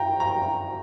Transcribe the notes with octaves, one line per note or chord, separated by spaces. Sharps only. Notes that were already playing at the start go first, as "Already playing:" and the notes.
Already playing: G5 A#5
A#5